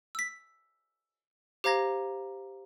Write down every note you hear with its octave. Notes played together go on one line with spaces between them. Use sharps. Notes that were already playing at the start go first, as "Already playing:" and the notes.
E6 B6
G4 C5 F5 A#5 G#6 A#6